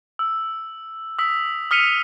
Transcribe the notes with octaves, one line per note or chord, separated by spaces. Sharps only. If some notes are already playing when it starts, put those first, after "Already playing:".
E6
D#6 E6 B6
D#6 F6 B6 C#7 D#7 F7